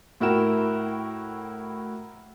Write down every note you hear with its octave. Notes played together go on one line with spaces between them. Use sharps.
A2 E4 F#4 A#4 G5 E7